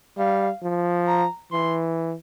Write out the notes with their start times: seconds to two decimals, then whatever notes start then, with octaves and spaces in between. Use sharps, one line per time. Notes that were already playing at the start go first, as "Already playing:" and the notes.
0.18 G3 F5
0.63 F3
1.07 A#5
1.52 E3 C6